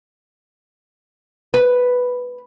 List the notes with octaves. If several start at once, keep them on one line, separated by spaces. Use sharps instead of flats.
B4